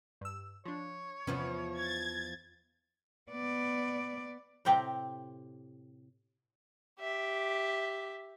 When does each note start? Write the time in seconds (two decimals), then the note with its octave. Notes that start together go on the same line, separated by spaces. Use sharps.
0.21 G2 E6
0.66 F3 D4 C#5
1.27 E2 C3 F3 B3 C#4 B4
1.77 G#6 A6
3.31 B3 D5
4.65 A2 C3 C4 G4 A#5
6.99 G4 E5